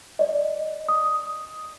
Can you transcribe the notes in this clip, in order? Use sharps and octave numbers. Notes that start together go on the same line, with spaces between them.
D5 D#5
D#6